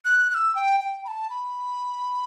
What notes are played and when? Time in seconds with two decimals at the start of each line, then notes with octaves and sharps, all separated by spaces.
0.05 F#6
0.30 F#6
0.35 E6
0.55 G5
0.80 G5
1.05 B5
1.08 A5
1.30 B5